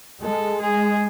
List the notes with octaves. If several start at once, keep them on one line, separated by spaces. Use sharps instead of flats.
G#3 A4
G#4